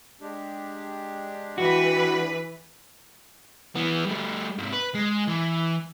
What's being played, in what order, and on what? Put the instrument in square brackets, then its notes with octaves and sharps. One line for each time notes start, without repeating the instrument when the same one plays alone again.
[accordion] G#3 D4 G4
[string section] E3 B4 [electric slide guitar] F#4
[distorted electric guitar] E3 B3
G3 A3
G#2 C3
B4
G#3
E3